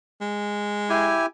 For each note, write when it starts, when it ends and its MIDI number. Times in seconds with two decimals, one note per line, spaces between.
0.21 1.16 56
0.90 1.26 64
0.90 1.26 67
0.90 1.26 80